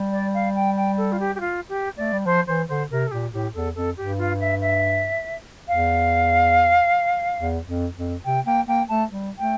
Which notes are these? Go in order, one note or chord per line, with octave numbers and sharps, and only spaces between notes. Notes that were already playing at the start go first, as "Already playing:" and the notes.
Already playing: G3
D5
F5
G5
G5
A4
F4
G4
G4
F4
G4
A3 D5
G3
F3 C5
E3 C5
D3 C5
C3 A#4
A4
A#2 G4
A2 G4
E2 A4
F2 A4
G2 G4
F4
E5
E5
E2 F5
E2
F2
F2
C3 G5
A#3 G5
A#3 G5
A3 A5
G3
A3 G5